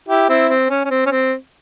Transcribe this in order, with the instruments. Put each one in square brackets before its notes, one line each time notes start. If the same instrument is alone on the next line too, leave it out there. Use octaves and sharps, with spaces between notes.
[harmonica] E4 G4
C4 E4
C4
C#4
C#4
C4
C#4
C4